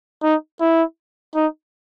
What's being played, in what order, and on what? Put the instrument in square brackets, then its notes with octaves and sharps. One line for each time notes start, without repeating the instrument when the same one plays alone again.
[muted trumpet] D#4
E4
D#4